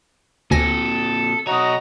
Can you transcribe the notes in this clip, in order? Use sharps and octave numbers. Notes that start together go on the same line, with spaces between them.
D2 A#2 C4 A4 G#5 A#6
B2 F#4 C#5 D#5 A#5